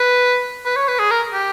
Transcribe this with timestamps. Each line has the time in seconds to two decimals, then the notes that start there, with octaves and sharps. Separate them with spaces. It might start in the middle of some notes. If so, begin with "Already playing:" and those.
Already playing: B4
0.65 B4
0.76 C#5
0.88 B4
0.99 G#4
1.11 A#4
1.33 G4